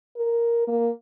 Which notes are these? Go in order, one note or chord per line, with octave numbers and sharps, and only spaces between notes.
A#4
A#3